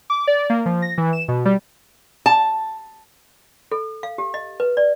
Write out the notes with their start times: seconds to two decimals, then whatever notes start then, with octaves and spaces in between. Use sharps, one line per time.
0.10 D6
0.27 D5
0.50 A#3
0.66 F3
0.82 A#6
0.98 E3
1.13 E7
1.28 B2
1.45 G3
2.26 A5
3.72 A4
4.03 F5
4.18 G4
4.34 D#5
4.60 B4
4.77 D5